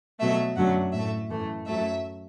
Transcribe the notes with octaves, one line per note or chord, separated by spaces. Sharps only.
B2 F#3 A3 E5
F#2 D3 F#3 A3 F#5
A2 A3 E5
F#2 E3 A3
F#2 F#3 A3 E5